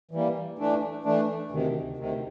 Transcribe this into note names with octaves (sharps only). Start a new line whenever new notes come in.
E3 G3 A#3
E3 A3 D4
E3 A3 D4
D2 C3 D#3
D2 C3 D#3